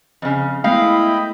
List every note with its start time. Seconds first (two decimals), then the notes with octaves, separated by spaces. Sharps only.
0.22 F2 C#3
0.64 G#3 A3 B3 E4 D#5 F5 G5 B5